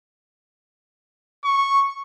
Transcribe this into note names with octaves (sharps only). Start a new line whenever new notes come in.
C#6